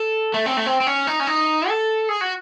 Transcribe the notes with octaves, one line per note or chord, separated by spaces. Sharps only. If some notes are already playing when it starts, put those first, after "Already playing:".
Already playing: A4
A3
C4
A3
C4
C4
C#4
D#4
C#4
D#4
A4
G#4
F#4